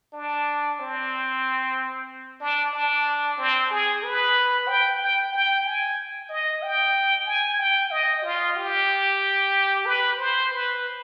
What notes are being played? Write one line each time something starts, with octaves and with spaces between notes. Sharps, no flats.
D4
C4
D4
D4
C4
G#4
B4
G5
G5
G5
G#5
D#5
G5
G#5
G5
D#5
F4
G4
B4
C5
B4